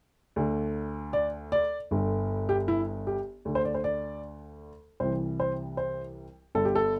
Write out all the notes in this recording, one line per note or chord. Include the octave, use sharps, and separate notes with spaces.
D2 D3
D5
D5
G1 G2 D3
G4
E4
G4
D2 D3
C5
D5
C5
D5
C2 C3 E3 C5
C5
C5
G1 G2 D3 A4
G4
A4